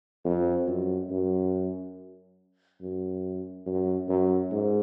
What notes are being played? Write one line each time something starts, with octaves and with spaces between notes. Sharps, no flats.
F2
F#2
F#2
F#2
F#2
F#2
G#2